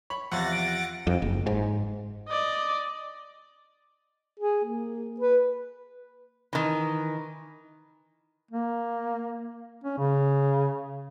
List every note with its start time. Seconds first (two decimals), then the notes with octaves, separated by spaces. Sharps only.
0.10 C#5 B5
0.32 E2 C3 F3 F#5 A6 A#6
0.52 D7
1.07 F2
1.22 F#1
1.47 G#2
2.28 D5 D#5
4.39 G#4
4.64 A#3
5.20 B4
6.53 D#3 E3
8.51 A#3
9.84 C#4
9.98 C#3